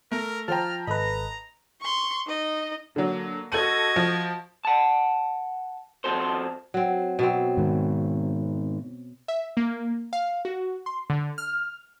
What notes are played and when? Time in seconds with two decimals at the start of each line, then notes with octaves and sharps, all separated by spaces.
0.12 A3 A#4
0.48 F3 C5 G5 A5 A#5 F6
0.87 G#1 A4 B4 D#5 A#5
1.81 C6 C#6
2.27 D#4 D#5
2.96 D3 F#3 A#3
3.52 F#4 A4 D#5 G#6 D#7
3.96 F3
4.65 F#5 A5
6.04 F3 C4 F#4 A4 C5
6.74 F#3 C4
7.19 B2 F#3 C4
7.57 G#2 D#3
9.28 E5
9.57 A#3
10.13 F5
10.45 F#4
10.86 C6
11.10 D3
11.38 F6